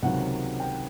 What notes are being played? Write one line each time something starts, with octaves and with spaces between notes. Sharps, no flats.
C#2 C3 D#3 F#3 F#5
G5